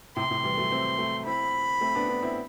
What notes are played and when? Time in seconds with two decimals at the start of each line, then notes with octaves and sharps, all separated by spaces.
0.16 A2 C3 C6
0.30 A2 C3
0.44 E3 G3
0.57 F#3 A3
0.72 A3 C4
0.98 A3 C4
1.26 C4 E4 B5
1.81 A3 C4
1.95 B3 D4
2.09 B3 D4
2.22 C4 E4